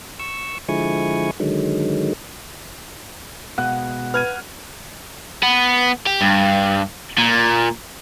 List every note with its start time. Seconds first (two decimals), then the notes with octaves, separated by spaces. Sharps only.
0.19 C#6 E6
0.69 D3 F3 G#3 E4 G#5 C#6
1.40 D3 D#3 F#3 G#3
3.58 B2 G#3 F#5
4.14 B4 F6 G#6 D#7
5.43 B3
6.07 G4
6.21 G2
7.18 A#2